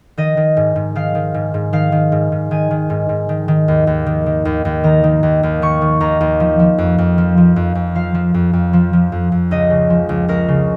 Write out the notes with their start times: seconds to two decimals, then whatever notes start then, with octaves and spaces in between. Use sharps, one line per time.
0.17 D#3 D#5
0.37 D#3
0.57 G#2
0.76 G#2
0.95 D#3 F5
1.15 D#3
1.34 G#2
1.54 G#2
1.73 D#3 F5
1.92 D#3
2.12 G#2
2.32 G#2
2.51 D#3 G#5
2.71 D#3
2.90 G#2
3.09 G#2
3.29 D#3
3.48 D#3
3.68 D#2
3.87 D#2
4.06 D#3
4.26 D#3
4.45 D#2
4.65 D#2
4.84 D#3 A#5
5.04 D#3
5.23 D#2
5.43 D#2
5.62 D#3 C#6
5.82 D#3
6.00 D#2 A#5
6.20 D#2
6.40 F3
6.59 F3
6.78 F2
6.98 F2
7.18 F3
7.37 F3
7.56 F2
7.75 F2
7.95 F3 F5
8.15 F3
8.34 F2
8.53 F2
8.73 F3
8.93 F3
9.12 F2
9.32 F2
9.51 C#2 D#5
9.70 C#3
9.90 F3
10.09 C#2
10.28 C#2 A#4
10.48 C#3